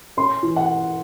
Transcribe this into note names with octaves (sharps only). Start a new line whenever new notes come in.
C#4 C6
E3
F#5